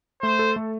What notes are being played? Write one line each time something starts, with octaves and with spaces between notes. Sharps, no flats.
A3 C5
A4
A3